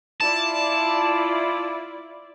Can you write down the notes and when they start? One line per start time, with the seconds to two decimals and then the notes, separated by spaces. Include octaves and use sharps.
0.20 E4 F4 D5 A5